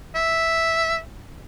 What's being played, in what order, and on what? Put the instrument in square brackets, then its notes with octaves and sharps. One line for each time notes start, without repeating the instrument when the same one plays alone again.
[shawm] E5